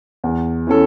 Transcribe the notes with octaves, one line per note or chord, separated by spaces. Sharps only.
E2
E3 C#4 A4